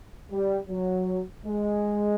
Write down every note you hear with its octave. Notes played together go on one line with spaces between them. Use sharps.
G3
F#3
G#3